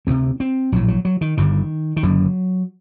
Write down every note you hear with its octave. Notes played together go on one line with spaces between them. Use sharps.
D2 C3 C4
C4
A#1 A2 F#3
F#3
F#3
D#3
G1 G2 D3 D#3
D#3
F#1 F#2 D3 F#3